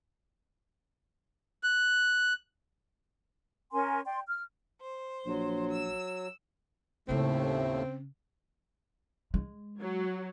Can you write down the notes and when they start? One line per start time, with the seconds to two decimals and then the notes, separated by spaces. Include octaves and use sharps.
1.63 F#6
3.72 C#4 A#4 G#5 C6
4.05 D5 G5 C6
4.27 F6
4.80 C5
5.26 A#1 F#3
5.70 E6
7.08 D#2 A2 C#3 A3 C4 C#4
9.34 G#3
9.81 F#3